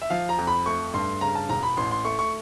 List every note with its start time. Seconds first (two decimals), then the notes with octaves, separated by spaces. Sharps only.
0.02 E5
0.10 F3 F5
0.29 A#5
0.38 F2
0.47 B5
0.66 A3 C#6
0.94 G2 C6
1.21 C#3 A#5
1.35 A5
1.49 E1 A#5
1.63 B5
1.77 A1 C6
1.91 C6
2.05 A3 C#6
2.19 C#6